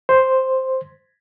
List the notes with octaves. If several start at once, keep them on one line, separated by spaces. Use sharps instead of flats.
C5